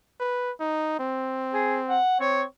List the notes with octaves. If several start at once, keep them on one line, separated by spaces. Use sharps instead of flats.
B4
D#4
C4
G#4
F#5
C4 C#5